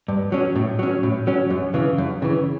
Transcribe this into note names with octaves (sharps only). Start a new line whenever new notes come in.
G2
F#3 C#4
A2
F#3 C#4
A2
F#3 C#4
F#2
C#3 E3
F#2
C#3 E3